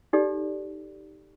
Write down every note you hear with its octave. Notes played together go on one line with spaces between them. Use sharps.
D#4 G4 A4 D5